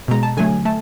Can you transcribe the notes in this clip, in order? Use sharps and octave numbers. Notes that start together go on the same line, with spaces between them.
B2 G#3 A#5
A5
D3 F#3 A3 G#5
A3 A5